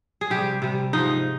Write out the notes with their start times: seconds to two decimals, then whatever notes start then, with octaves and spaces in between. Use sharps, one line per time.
0.21 G#4
0.30 C3 G3 G4
0.62 C3 G3
0.93 G#2 F3 D#4